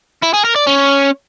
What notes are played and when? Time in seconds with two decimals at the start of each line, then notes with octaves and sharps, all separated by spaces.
0.22 E4
0.33 G#4
0.45 A#4
0.56 D5
0.67 C#4